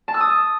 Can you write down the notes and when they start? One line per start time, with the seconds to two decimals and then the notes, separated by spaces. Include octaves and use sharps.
0.08 A5
0.14 E6
0.21 D#6